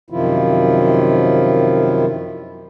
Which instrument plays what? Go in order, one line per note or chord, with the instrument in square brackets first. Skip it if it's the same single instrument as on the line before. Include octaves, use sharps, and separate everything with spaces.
[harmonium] F#2 C3 D#3 F3 E4 F4